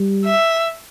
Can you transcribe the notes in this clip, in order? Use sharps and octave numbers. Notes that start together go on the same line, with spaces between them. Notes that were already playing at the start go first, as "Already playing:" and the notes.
Already playing: G3
E5